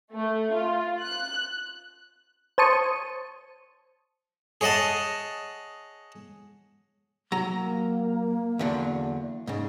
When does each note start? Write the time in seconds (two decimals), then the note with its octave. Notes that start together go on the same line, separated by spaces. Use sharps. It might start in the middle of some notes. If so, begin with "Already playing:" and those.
0.14 A3
0.53 F4
1.01 F#6
2.58 C5 C#5 A5 D#6 C#7
4.61 G#4 C#5 D#5 F#5 A5
7.32 F#3 A#5
7.51 A#3
8.59 E2 D3 F#3
9.47 G#2 C#3